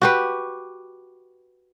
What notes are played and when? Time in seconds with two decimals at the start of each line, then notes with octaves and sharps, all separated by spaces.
0.02 F#4 G4 B4